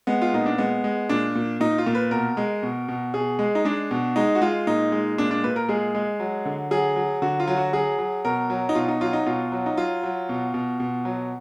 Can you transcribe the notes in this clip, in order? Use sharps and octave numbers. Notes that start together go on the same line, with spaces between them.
G#3 B3
F4
A#2 D#4
D4
G#3 B3
G#3
A#2 D4
A#2
A#2 D#4
F4
A#2
B4
B2 A#4
G#3
B2
B2
B2 G#4
G#3
D#4
G#3 D4
B2
G#3 D#4
F#4
G#3 F4
A#2 D#4
G#3
A#2 D4
D4
A#2 B4
A#4
G#3 G#4
G#3
F#3
D3
F#3 G#4
F#3
D3 F#4
F4
F#3
F#4
F#3 G#4
F#3
B2 A#4
F#3
D#4
B2 F4
D#4
F#3 F4
D#4
B2 F4
F#3
D#4
F#3 F4
F#3
B2
B2
B2
F#3